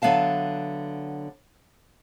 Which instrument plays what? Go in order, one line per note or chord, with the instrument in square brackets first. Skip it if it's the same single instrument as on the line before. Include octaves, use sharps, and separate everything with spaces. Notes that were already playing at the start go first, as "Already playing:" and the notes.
[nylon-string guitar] D3 F#3 B3 E5 F5 A5